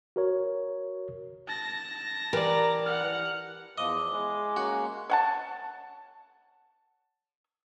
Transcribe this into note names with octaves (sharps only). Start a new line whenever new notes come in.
F#4 A#4 C#5
A5 A#6
E3 G4 A#4 D5
F#5 F6
E2 F3 F4 D#5 D6
G#3 E4
A#3 C#4 F#4
C#5 F#5 A5